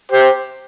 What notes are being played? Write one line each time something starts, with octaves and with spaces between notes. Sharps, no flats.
G4 C5